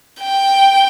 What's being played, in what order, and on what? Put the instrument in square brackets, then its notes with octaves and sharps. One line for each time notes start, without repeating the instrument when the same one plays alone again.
[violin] G5